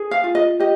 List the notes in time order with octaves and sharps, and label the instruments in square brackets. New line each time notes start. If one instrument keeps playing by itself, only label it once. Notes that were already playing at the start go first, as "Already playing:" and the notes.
Already playing: [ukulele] G#4
F5
F4
D#5
G4 D#5